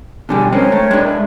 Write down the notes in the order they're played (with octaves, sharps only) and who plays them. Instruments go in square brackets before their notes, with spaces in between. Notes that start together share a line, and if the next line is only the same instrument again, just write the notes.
[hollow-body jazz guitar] B2 D3 G3 [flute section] G#4 G#5
[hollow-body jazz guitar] G#3 C4 C#4 [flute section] A#4 C#5 G5
[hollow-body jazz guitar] A3
G#3 D4
[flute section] E5